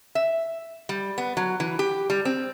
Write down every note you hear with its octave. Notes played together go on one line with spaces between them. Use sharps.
E5
G3
B3
F#3
E3
G4
G3
C4